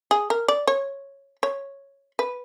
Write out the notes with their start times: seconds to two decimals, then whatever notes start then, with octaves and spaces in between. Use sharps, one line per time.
0.11 G#4
0.30 A#4
0.48 D5
0.67 C#5
1.43 C#5
2.19 B4